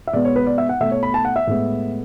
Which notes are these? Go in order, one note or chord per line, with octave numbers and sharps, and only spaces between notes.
E5
B2 G#3 B3 D5
C#5
B4
D5
E5
F#5
B2 A3 E5
C#5
B5
A5
F#5
E5
A2 G#3 B3